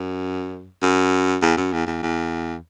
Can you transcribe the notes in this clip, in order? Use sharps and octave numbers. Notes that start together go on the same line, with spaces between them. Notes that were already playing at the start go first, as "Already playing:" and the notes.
Already playing: F#2
F#2
E2
F#2
E2
E2
E2